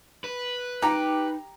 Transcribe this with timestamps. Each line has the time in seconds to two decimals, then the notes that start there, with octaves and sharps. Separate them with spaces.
0.24 B4
0.82 D#4 G4 A#5